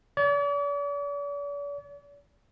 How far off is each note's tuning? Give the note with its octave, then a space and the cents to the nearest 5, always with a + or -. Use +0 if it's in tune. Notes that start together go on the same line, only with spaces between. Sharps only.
D5 -45